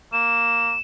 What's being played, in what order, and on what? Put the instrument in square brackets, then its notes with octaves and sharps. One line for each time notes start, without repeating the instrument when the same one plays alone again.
[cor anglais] A#3 [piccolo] E7